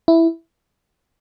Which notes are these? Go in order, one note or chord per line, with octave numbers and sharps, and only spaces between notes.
E4